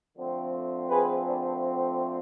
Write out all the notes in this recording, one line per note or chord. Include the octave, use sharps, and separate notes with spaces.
D3 F3 A3 C4
G#4 B4
D4